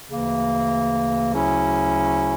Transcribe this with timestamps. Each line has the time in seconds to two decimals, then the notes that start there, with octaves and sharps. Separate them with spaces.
0.11 D2 C#3 E3 A#3
1.33 D2 C#3 F#3 C#4 E4